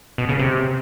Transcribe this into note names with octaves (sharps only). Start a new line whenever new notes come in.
B2
C#3
C3